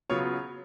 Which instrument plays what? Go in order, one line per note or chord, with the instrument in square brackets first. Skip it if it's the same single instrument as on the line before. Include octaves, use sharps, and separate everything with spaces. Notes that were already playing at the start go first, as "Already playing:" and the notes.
[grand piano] C#3 F#3 B3 F4 C#5